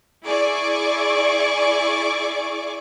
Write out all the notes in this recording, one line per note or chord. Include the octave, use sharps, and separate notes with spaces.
E4 G#4 D5 G#5 C#6 D6